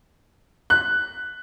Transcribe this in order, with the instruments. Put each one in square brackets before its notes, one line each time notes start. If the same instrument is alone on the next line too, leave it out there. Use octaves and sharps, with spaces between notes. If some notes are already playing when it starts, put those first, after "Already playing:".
[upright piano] F#6